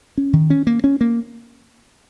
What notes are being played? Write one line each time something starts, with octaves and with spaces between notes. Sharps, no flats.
C#4
D#3
C#4
A#3
C#4
A#3